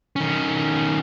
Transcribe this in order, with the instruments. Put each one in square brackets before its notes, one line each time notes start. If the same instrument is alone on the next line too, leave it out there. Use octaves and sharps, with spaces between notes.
[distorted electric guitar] D#3 C#4